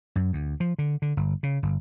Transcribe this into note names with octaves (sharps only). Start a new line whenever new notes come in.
F#2
D2
F3
D3
D3
G1
C#3
G1